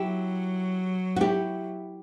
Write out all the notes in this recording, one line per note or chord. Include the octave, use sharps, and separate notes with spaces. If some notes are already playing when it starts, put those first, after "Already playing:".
Already playing: F#3 E4 G4
F#4
E4 G4